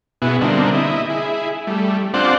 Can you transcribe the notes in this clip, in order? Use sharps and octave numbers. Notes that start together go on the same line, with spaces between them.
B2 B3 E4 F#4 G#4
D3 G3 A#3 C4 D4 D#4
E4 D#5
E4 G#4
G3 A3
C4 D4 F4 C5 D5 F#5